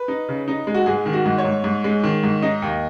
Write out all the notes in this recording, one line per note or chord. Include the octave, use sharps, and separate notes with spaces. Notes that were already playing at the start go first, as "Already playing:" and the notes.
Already playing: B4
D#4
C#3
D#4
G#3
F#4
G#2 G#4
D#3
F#4
G#2
C#5
G#2
G#2
G#3
D#3
G#2
D#4 D#5
D#2